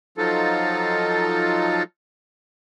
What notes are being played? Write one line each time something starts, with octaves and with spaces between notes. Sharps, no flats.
F3 F#3 D#4 F4 A4